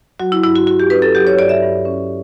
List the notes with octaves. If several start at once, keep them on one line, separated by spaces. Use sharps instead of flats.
F#3 F#4
E4
G2 E4
F#4
G2 F#4
G4
C#4 B4
A4
F#3 G4
C#5
G2 D5
E5
G2
C#4